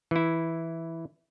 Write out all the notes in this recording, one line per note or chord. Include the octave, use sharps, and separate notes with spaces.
E3 E4